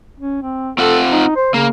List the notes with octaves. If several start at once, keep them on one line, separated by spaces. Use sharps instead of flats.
C#4
C4
C4 F4 A4 F#5
D#4
C5
C#3 A#3